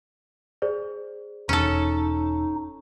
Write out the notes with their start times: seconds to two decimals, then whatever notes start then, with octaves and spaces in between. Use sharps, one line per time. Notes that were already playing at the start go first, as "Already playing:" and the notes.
0.62 G#4 C5 D5
1.49 E1 C#4 D#4 A4